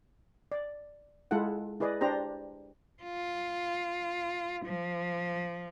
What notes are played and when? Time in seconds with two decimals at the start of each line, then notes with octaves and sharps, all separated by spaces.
0.52 D5
1.31 G#3 E4 F4 A4 F#5
1.80 E4 G#4 B4 D5 D#5
2.01 D4 G4 C5 A#5
3.03 F4
4.65 F3